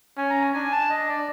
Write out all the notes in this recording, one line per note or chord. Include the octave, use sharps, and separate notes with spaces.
C#4 G#5
A#5
G#5
D4 G#5
A5
D#5
D5